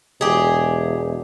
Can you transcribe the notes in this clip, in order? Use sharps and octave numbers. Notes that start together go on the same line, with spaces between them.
E1 G4 G#4